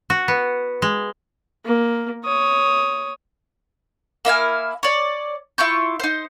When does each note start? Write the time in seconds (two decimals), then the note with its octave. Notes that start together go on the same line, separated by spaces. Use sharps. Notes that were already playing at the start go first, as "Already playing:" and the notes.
0.10 F#4
0.28 B3
0.82 G#3
1.65 A#3
2.25 C#5 D#6
4.25 A#3 E4 F5 G#5
4.83 C#5 D5
5.58 E4 F4 C#6 G6
6.00 D#4 C5